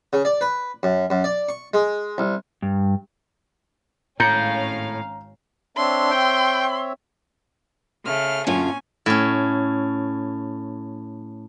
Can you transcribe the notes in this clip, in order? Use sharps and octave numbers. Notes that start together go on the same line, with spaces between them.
C#3
D5
B4
F#2
F#2
D5
C#6
G#3
C2
G2
G#1 A2 C#4 F5 A#5 G6 C#7
C4 D4 C#5 E5 C6
G5
C#3 A3 F6
F#2 A#2 D3 C#4 F4 G#5
A2 C#4